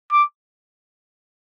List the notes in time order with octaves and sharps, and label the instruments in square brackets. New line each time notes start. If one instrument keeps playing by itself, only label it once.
[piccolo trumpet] D6